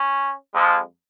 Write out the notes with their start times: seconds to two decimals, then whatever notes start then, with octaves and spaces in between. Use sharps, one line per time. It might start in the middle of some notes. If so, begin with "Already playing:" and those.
Already playing: C#4
0.53 F2 F3 G#3